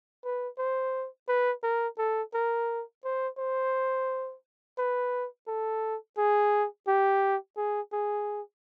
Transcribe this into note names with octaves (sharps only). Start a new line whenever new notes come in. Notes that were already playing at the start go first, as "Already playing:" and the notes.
B4
C5
B4
A#4
A4
A#4
C5
C5
B4
A4
G#4
G4
G#4
G#4